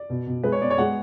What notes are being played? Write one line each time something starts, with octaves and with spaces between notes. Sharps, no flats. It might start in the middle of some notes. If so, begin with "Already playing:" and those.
Already playing: D5
B2
B2
G#3 B4
C#5
B3 D5
C#5
G#3 F#5